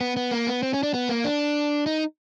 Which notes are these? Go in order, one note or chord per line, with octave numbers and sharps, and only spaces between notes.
B3
B3
A#3
B3
C4
C#4
D4
B3
A#3
D4
D#4